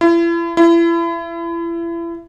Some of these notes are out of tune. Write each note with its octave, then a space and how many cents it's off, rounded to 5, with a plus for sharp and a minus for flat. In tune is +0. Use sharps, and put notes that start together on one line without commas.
E4 +40
E4 +35